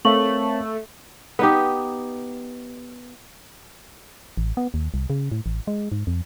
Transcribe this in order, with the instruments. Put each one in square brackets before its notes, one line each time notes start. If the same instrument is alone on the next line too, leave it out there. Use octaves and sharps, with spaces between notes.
[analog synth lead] A3 [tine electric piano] C4 A#4 C#5 [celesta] F5 C#6 F#7
[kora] B3 D#4 G4
[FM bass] A1
B3
D#2
C2
C#3
A2
A1
G#3
G#2
F2